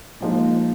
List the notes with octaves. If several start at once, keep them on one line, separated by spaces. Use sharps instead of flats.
A#2 F3 G#3 D#4